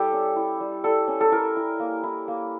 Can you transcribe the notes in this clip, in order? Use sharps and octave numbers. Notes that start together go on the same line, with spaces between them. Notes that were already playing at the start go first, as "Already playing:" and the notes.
Already playing: G3 E4 G4 A4
C#4
E4
G3
G3 A4
C#4
A4
E4 A#4
E4
A#3
E4
A#3